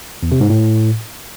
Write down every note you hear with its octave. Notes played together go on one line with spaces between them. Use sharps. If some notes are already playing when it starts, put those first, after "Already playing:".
E2
C3
G#2
A2